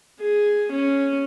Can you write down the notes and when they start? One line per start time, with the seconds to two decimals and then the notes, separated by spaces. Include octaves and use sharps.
0.21 G#4
0.72 C#4